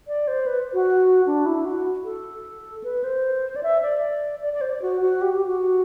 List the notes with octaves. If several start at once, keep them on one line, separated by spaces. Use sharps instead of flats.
D5
C5
B4
F#4
D4
E4
F#4
A4
B4
C5
D5
E5
D5
D5
D5
C5
F#4
F#4
G4
G4
F#4